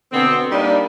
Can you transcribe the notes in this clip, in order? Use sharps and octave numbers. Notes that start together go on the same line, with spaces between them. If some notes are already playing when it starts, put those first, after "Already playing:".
B2 D3 B3 C4
G3 A#3 D4 D#4